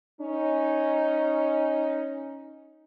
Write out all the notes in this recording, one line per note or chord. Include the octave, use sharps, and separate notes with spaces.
C#4 D#4